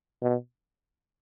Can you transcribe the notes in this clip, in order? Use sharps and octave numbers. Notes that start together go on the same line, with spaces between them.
B2